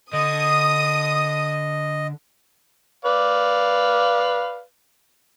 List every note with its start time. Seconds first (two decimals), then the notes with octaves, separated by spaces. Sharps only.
0.13 D3 D#5 D#6
3.05 B4 D5 F5